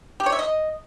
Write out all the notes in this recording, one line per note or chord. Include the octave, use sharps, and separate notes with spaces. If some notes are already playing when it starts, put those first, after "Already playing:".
G4
C#5
E5
D#5